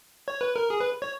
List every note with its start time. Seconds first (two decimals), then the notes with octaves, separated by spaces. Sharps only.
0.28 C#5
0.41 B4
0.56 A#4
0.70 G#4
0.80 B4
1.02 C#5